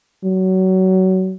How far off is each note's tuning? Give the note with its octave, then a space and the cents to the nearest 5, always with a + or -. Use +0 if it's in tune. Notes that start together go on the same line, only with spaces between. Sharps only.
F#3 +25